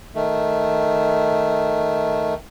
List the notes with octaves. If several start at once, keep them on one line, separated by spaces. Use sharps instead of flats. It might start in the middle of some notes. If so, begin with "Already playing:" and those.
D#3 A3